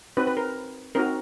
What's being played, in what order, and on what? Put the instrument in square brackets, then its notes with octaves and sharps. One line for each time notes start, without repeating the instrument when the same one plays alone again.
[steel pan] C4 D#4 F#4 B4
B4
A#4
C4 D#4 F#4 A#4